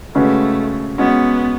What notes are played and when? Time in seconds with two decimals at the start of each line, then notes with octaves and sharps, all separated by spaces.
0.15 C#3 G#3 A3 C#4 F#4 B4
0.98 G#3 B3 C#4 F#4